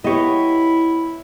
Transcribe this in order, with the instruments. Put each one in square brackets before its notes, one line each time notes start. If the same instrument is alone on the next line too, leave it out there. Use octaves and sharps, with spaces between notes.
[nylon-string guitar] B3 G4 [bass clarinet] E4 [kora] C#5 D#5